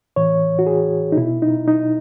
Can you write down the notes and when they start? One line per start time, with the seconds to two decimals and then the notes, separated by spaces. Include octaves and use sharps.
0.16 A2 E3 C#5
0.59 F#4
0.67 G#4
1.12 D#4
1.17 B2 E4
1.42 D#4
1.68 D#4